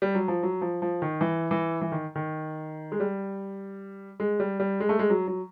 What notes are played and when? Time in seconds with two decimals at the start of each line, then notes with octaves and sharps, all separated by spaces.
0.02 G3
0.15 F#3
0.28 F3
0.43 F#3
0.61 F3
0.82 F3
1.02 D#3
1.21 E3
1.51 E3
1.81 E3
1.92 D#3
2.15 D#3
2.92 G#3
3.00 G3
4.20 G#3
4.40 G3
4.60 G3
4.80 G#3
4.89 A3
4.99 G#3
5.10 F#3
5.27 F#3